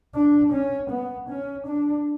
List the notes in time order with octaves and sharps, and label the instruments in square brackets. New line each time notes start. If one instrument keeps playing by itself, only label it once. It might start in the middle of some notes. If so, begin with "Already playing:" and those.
[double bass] D4
C#4
B3
C#4
D4